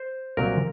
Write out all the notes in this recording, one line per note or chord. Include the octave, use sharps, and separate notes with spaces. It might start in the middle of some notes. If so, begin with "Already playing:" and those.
Already playing: C5
C2 A#2 F#3 C4 A#4